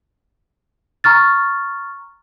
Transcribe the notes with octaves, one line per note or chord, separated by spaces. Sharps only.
A#5 C#6 F6 A6